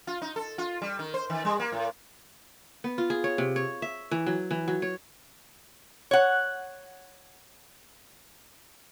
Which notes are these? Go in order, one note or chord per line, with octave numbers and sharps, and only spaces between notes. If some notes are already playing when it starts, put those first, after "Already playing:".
F4
D#4
A4
F4
G3
D#3
C5
D#3
G3
A#3
A2
B3
F4
G#4
C#5
C3
C#5
E5
E3
F#3
E3
F#3
C#5
C#5 F#5